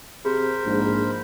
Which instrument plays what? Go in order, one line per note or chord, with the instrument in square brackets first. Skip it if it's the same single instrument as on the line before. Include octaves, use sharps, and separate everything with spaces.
[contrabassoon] C3 [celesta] G#4 [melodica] A#4 C5 B5
[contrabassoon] A#1 [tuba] G#2